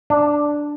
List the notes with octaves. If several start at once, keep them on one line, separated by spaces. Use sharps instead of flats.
D4